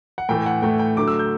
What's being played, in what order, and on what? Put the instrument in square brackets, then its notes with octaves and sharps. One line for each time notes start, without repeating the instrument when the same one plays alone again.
[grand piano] F#5
A2 E3 A3 G5
F#5
A2 E3 A3 G5
G5
D3 F#3 A3 D6
E6
G6